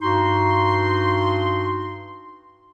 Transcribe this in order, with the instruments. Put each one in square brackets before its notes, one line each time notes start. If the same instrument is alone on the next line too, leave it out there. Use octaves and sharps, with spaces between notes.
[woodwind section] G2 D#4 F#4 C6